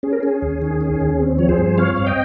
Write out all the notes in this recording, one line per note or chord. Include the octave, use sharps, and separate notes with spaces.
C#4 G#4
A#4
C#4 G#4
D#2
D#3
C#4
D#2
C4
F3 C#5
G#4 C5
G2
C4 C#5 F5
G2
D#5 G5